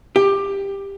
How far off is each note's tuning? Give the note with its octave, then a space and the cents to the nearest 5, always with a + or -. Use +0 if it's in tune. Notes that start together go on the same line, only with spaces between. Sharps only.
G4 +15